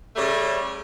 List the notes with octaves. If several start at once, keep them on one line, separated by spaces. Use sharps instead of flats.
C#3 G3 A3